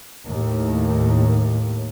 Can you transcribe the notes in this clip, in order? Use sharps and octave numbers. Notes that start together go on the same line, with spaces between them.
D#2 A2